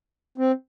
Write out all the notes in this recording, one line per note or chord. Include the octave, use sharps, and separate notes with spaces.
C4